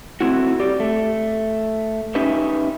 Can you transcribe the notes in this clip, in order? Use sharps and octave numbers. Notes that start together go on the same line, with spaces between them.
A3 C4 E4 F#4
G4 D5
A3
C#4 D#4 G4 B4 E5